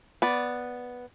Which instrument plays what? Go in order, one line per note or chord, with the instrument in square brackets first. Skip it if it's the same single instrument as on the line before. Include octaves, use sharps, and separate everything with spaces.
[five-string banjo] B3 D5